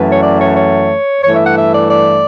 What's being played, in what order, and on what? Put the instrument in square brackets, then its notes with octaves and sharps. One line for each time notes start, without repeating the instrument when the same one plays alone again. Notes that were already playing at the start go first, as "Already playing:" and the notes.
Already playing: [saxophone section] F#2 E3 A3 B4
C#5
D5
C#5
C#5
G2 E3 A3 C#5
E5
F#5
E5
D5
D5